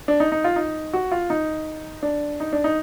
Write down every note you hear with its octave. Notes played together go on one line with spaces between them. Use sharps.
D4
D#4
D#4
F4
D#4
F#4
F4
D#4
D4
D#4
D4
D#4